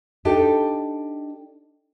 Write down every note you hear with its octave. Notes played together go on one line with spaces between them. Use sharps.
D4 D#4 G4 A4